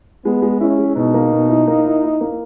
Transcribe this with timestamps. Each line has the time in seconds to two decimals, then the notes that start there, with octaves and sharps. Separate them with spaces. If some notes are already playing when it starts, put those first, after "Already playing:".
0.25 G#3 B3
0.42 G#3
0.60 C#4 E4
0.79 G#3
0.96 B2 D#4
1.14 A#3
1.32 B2
1.50 E4
1.68 A#3
1.86 E4
2.03 E4
2.21 A#3